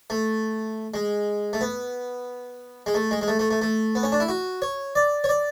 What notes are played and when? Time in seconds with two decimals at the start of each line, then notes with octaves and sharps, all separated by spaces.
0.10 A3
0.94 G#3
1.53 A3
1.61 B3
2.86 G#3
2.94 A3
3.11 G#3
3.21 G#3
3.28 A3
3.39 A3
3.51 A3
3.62 A3
3.95 B3
4.03 C#4
4.12 D4
4.20 E4
4.28 F#4
4.62 C#5
4.95 D5
5.24 C#5
5.29 D5